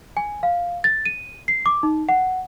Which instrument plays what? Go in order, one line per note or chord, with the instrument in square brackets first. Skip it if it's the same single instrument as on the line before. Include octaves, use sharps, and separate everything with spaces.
[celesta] G#5
F5
A6
D#7
C7
D6
D#4
F#5